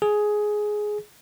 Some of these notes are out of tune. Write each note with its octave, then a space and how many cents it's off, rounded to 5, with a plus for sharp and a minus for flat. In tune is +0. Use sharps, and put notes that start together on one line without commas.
G#4 +10